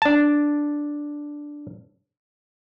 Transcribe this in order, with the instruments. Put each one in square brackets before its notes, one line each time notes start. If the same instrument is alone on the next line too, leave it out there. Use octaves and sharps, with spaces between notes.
[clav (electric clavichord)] D4 A5